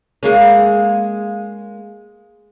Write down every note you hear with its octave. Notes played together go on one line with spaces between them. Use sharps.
G#3 A#3 C#4